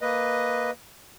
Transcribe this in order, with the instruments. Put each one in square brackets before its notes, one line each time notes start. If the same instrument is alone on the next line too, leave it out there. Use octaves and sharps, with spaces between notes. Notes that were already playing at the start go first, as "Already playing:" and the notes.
[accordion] A#3 B4 D#5